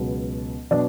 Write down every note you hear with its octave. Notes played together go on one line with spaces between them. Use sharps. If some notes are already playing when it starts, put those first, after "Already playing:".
Already playing: C#2 B2 F#3
B2 F#3 D4